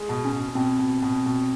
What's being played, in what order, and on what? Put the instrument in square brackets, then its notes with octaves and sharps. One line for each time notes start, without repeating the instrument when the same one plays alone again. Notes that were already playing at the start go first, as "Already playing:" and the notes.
Already playing: [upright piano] G#3
B2
[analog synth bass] C#4
[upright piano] B2
[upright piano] B2 [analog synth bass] C4
[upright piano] B2
B2
B2